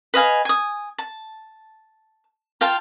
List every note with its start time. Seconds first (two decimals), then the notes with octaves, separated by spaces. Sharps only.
0.14 B4 D#5 F5 G#5
0.45 G#5 D#6
0.98 A5
2.61 F4 F5 G5 A5